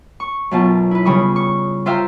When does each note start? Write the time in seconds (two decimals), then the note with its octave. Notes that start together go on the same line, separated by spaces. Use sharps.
0.20 C#6
0.51 F#2 B2 F4 A5
0.91 E4 B4
1.05 C#3 G3 B5 C#6 D#6
1.36 C#6
1.86 F4 C5 E5 F5 G5 A#5